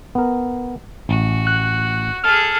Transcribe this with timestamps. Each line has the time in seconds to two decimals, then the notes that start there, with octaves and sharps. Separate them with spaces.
0.15 B3 A#4
1.09 A1 F#4
1.47 F#6
2.24 G#4 A4 F6